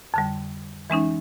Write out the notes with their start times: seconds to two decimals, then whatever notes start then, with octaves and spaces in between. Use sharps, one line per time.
0.14 F2 D3 G3
0.90 E3 G#3 C#4 D#4